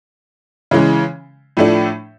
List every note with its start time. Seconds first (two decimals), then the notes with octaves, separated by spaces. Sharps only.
0.71 C#3 E3 G#3
1.57 A2 F3 A3 D4